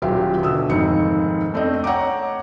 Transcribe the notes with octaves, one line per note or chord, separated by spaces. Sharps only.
D#1 F#3 F4 G4 E5
B2 D3 D#6 E6
F1 D#2 G#2 C4 C#7
A3 C4 D4 D#5
C#5 F#5 G5 A#5 D6